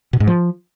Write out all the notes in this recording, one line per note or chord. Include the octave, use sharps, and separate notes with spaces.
B2
G#2
F3